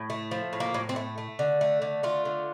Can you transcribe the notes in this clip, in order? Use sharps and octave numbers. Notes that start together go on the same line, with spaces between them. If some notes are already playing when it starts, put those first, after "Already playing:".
Already playing: A2
A3
F3
A2
A#3
A2
C4
A3
A3
D3
A3
D3
A3 F4
D3